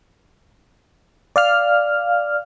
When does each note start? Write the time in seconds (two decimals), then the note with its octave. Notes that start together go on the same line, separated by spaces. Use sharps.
1.36 D5 F5 F6